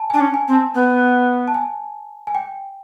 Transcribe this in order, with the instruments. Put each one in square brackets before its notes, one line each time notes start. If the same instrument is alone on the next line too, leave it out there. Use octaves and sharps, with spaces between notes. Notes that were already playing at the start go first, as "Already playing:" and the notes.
Already playing: [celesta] G#5 A5
G#5
[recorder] D4 [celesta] A5
[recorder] C#4
[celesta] G#5
[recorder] C4
[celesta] A5
[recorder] B3
[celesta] A5
G#5
G#5
G5